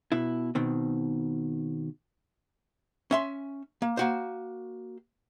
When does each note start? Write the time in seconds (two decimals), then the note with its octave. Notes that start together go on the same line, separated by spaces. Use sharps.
0.12 B2 E4
0.55 B2 D#3 C4
3.11 C#4 E5 C6
3.82 A#3
3.97 A#3 F#4 C5